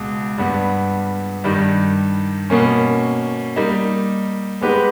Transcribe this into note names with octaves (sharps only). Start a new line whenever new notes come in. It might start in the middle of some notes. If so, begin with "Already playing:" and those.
Already playing: C#2 B2
G2 G3 B3
G2 D#3 G3
B2 A#3 C#4
G3 A#3 D#4
G#3 B3 D#4 G4 B4